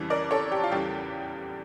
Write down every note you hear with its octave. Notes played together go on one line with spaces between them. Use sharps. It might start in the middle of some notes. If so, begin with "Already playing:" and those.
Already playing: F2 C#3 E3 G3
A#4 D5
A4 C#5
G4
F4
E2 C#3 E3 G3 G4